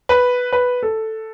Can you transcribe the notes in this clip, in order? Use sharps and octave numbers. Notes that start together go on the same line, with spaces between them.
B4
B4
A4